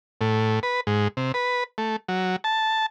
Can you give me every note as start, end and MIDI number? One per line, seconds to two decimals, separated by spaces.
0.21 0.59 45
0.63 0.80 71
0.87 1.08 44
1.17 1.32 48
1.34 1.64 71
1.78 1.96 57
2.08 2.36 54
2.44 2.86 81